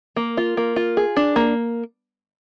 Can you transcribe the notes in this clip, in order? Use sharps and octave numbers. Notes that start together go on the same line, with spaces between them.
A#3
F4
A#3
F4
G#4
D4
A#3